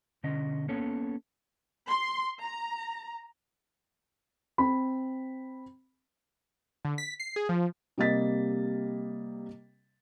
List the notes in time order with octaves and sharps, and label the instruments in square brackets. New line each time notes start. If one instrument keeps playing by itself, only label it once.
[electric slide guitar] B2 D3 C#4 D#5
A#3 B3 C#4 A4 C#5
[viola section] C6
A#5
[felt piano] C4 B5
[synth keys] D3
B6
C7
G#4
F3
[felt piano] C3 G3 A#3 D#5 A6 B6